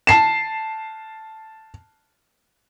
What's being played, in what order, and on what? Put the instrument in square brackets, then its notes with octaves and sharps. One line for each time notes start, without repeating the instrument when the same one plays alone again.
[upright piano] A5 C7 E7